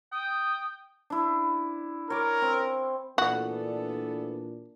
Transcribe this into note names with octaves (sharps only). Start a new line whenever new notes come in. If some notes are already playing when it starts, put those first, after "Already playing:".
G5 D#6
D4 E4
A#4 C#5 D6
C4
A#2 E3 A3 B3 D4 F#4 A4